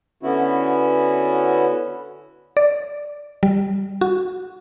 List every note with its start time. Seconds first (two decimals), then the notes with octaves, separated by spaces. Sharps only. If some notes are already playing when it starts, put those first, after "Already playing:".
0.23 D3 B3 C#4 E4 F#4
2.57 D5
3.43 G3
4.01 F#4